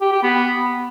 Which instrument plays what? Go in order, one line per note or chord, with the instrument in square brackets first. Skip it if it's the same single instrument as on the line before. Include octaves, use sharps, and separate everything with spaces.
[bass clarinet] G4
G4
B3